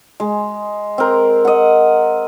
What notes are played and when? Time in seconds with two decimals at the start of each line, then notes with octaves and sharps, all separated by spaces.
0.20 G#3
0.98 C4 A#4
1.45 D#5 F#5